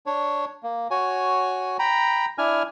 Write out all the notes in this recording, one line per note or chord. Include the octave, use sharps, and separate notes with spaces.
D4 C#5
A#3
F#4 C#5 G#5
G5 A#5 B5
D4 E4 G#5 F6